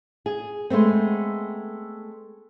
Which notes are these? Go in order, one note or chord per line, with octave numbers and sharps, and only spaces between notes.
G#4
G#3 A3 B3 C4